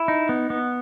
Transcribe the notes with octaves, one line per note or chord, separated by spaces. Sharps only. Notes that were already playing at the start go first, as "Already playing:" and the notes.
Already playing: E4
D#4
B3
B3